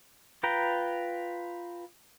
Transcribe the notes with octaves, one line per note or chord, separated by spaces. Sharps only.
F4 B4 G5 A#5